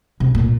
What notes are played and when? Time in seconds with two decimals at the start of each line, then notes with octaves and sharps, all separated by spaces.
0.20 C3
0.35 A#2